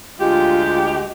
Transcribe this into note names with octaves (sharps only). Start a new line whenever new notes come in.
D2 G#3 F4 G4